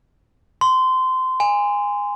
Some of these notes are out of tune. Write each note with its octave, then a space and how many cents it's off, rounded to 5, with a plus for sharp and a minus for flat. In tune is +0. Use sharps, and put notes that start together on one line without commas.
C6 -20
G#5 -20